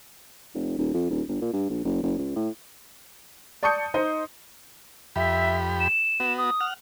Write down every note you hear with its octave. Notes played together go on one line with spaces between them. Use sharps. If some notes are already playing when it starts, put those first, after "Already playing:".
F1
D#1
F2
D#1
G1
A#2
G2
A#1
F#1
F#1
C#2
A2
D5 A5 C#6 D#6 G6 C#7
D#4 C5 D#5
F2 G4 E5 B5
E7
B3 F#4
D#6
F#5 F6